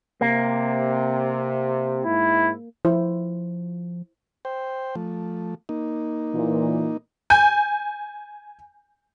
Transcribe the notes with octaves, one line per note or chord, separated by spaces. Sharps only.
C3 A#3
G#2 E4
F3 E4 C5
C5 G5
F3 A3
A#3 D#4
A#2 E3
G#5 G6